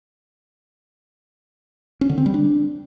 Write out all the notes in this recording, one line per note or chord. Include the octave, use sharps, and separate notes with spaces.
C#4
D3
C4
G3
D4